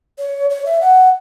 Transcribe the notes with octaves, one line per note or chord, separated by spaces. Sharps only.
C#5
C#5
E5
F#5